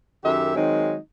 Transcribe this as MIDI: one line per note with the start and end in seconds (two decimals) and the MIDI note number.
0.24 0.53 42
0.24 0.53 51
0.24 0.53 67
0.24 0.53 69
0.24 0.53 76
0.55 0.96 51
0.55 0.96 54
0.55 0.96 56
0.55 0.96 60
0.55 0.96 63